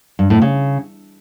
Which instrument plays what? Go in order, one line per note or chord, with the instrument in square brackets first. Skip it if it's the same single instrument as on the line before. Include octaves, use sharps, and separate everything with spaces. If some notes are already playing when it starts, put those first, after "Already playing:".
[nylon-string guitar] G2
A2
C#3